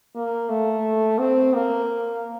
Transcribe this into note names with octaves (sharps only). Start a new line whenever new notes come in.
A#3
A3
C4
A#3